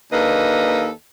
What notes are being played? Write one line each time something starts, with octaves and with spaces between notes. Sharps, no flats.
D#2 A#3 D4 A4 B4 D#5